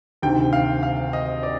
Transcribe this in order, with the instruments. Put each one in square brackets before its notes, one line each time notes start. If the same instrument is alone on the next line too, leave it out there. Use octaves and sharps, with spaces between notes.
[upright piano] D2 C3 D#3 [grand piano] G5
[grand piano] F5
F5
D#5
D5